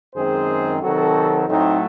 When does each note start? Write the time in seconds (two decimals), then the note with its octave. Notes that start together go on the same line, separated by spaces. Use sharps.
0.15 F#2 D#3 G#3 C4 G#4 C5
0.82 C3 D#3 F#3 C4 F#4 A4
1.48 A2 F#3 A3 C4 D#4